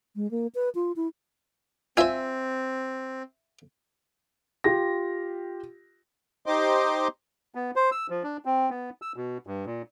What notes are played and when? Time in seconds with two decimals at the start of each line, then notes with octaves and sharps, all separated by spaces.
0.16 G#3
0.31 A#3
0.55 B4
0.75 F4
0.96 E4
1.97 C4 F4 C5 E5 G#5
4.64 F4 G4 A#6
6.46 D#4 G4 C5 D#5 C6 D6
7.55 B3
7.76 C5
7.92 E6
8.10 F3
8.23 D4
8.45 C4
8.70 B3
9.02 E6
9.16 B2
9.47 G2
9.66 A#2